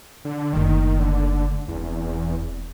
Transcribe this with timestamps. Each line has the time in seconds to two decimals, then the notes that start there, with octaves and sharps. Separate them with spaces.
0.25 D3
0.53 F#1 D#3 A3
0.99 D3
1.68 E1 E2 C4